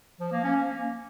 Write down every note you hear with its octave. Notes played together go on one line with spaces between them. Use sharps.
F3
A#3
C#4
A#3